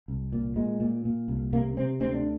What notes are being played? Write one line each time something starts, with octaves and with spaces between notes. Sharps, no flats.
C2
A#2
A#2 G#3
A#2
A#2
C2
C3 A#3
C3 C4
D2 C4
D4